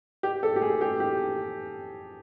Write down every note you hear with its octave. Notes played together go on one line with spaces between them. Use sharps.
G4
A4
G4
G#4
G4
G4